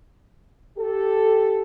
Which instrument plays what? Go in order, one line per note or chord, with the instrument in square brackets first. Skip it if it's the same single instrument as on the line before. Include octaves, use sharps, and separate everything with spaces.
[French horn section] G4 A4